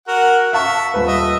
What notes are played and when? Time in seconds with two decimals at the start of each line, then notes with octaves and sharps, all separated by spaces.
0.08 F#4 A#4 F#5
0.53 E5 F5 A5 C#6
0.94 D#1 B4
1.08 D#5 E5